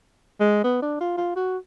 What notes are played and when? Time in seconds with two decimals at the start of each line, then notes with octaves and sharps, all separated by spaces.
0.40 G#3
0.64 B3
0.82 D4
1.01 F4
1.17 F4
1.36 F#4